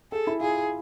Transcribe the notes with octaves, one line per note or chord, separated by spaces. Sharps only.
G#4 A4
E4
F4 G#4